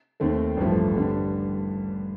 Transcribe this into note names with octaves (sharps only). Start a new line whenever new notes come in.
D#2 D#3 A3 C4
A1 G2 F3 A3
G2 D3 G3 D4